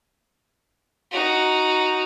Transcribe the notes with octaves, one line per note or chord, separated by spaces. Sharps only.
D#4 F#4